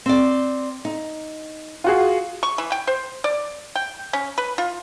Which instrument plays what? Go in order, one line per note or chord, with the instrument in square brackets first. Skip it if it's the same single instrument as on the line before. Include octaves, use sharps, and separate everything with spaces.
[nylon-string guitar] C4 D5
D#4
[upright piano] F4 F#4 G#4
[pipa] C#6
E3
G5
C5
D5
G5
C#4
B4
F4